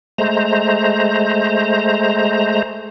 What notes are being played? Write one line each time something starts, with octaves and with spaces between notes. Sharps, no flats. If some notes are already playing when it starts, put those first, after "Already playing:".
G#3 A3 C5 A#5